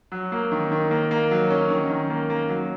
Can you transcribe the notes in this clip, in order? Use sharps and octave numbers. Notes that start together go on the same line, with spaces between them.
F#3
A#3
D#3
D#3
A#3
A#3
F#3
C#4
D#3
D#3
A#3
A#3
F#3